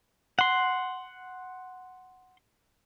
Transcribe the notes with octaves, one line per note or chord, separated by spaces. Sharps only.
F#5 C6